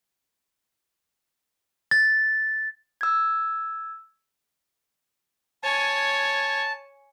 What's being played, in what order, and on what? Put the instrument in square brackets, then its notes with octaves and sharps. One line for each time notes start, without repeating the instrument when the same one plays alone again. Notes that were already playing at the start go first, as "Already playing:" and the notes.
[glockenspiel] A6
[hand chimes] E6 G#6
[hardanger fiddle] C#5 G#5 [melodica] A5